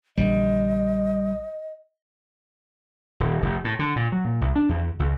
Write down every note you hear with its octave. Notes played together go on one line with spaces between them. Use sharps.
A#1 D3 E3 G3 D#5
D#1
F1
A2
D3
A#2
F#3
A#2
C2
D4
E2
C#2